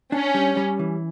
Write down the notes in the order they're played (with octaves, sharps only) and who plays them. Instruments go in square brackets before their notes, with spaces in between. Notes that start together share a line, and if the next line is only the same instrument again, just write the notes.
[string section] C#4 [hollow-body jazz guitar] D4
[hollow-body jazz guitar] G3
G3
E3